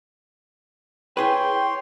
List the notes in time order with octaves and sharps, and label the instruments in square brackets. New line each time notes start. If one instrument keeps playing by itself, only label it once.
[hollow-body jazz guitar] E4 G#4 B4 [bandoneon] C#5 C6 [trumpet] G5